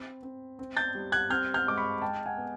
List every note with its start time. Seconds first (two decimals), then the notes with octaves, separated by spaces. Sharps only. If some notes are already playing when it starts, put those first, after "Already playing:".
Already playing: C4 B5
0.23 C4
0.59 C4
0.77 G6 A6
0.95 G3
1.12 F#6 G#6
1.30 C4 F6 G6
1.54 F6 G6
1.67 G#3 D6
1.77 B5 C#6
2.02 G#3 G5 A5
2.26 F#5 G#5
2.37 B3